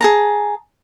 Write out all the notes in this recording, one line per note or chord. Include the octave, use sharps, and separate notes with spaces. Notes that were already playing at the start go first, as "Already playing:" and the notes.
G#4 A5 A#5